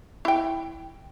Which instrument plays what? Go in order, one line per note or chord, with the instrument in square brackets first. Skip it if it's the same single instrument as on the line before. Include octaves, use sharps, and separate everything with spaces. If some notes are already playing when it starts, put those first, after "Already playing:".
[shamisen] E4 G5